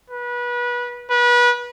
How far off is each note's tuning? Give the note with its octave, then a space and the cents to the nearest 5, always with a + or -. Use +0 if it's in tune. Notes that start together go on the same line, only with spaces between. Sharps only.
B4 -25
B4 -30